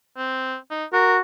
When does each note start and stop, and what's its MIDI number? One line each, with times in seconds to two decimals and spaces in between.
0.17 0.56 60
0.71 0.85 63
0.93 1.19 66
0.93 1.16 70